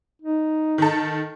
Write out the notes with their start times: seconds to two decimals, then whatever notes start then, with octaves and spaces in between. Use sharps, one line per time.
0.22 D#4
0.78 D#3 A4